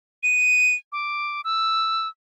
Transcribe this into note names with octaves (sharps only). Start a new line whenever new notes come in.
D#7
D6
E6